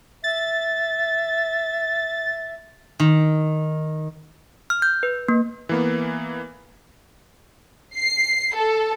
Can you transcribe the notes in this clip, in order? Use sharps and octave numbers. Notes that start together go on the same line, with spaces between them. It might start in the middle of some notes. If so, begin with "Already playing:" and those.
E5 A6
D#3
F6
G6
B4
A#3
E3 A#3 B3
C7
A4